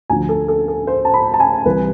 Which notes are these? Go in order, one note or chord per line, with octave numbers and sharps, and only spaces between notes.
D2 D3 F3 G#5
A4
A4
A4
C5
A5
B5
A5
G#5
C2 C3 E3 B4